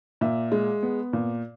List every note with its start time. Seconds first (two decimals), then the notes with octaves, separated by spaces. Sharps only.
0.21 A#2 E5
0.52 G#3
0.83 B3
1.13 A#2